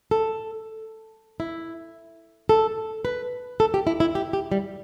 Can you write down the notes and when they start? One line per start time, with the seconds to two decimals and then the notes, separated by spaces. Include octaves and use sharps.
0.11 A4
1.40 E4
2.49 A4
3.05 B4
3.60 A4
3.74 G4
3.87 E4
4.00 E4
4.15 G4
4.33 G4
4.52 G3